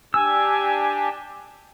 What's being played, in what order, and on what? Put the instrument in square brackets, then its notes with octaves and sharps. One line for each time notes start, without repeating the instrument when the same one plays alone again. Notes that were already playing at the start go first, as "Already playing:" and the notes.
[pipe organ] D4 G4 [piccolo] G#5 [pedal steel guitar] E6